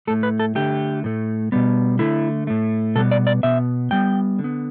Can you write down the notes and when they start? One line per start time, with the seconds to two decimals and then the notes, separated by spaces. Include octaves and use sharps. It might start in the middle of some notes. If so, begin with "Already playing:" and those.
0.07 A2 A3 A4
0.23 B4
0.40 A4
0.55 D3 A3 G4
1.04 A2 A3
1.52 B2 G3 B3
1.99 D3 A3 E4
2.47 A2 A3
2.95 B2 G3 B3 A4
3.11 D5
3.27 D5
3.43 B2 B3 E5
3.91 A2 G3 B3 G5
4.39 D3
4.44 B3